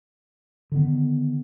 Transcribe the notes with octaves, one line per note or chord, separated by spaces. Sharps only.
D3 D#3 B3